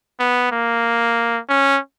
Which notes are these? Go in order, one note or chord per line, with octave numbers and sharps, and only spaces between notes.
B3
A#3
C#4